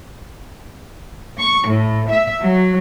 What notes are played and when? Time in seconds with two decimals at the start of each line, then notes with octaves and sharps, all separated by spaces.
1.37 C#6
1.66 A2
2.09 E5
2.43 F#3